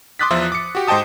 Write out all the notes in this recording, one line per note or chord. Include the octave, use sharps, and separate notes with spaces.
C6 D6 D#6 F#6 A6 B6
E2 F3 F4 C5 E5
D6 C#7
F#4 G4
G#2 C5 D#5 G5 A5 D#6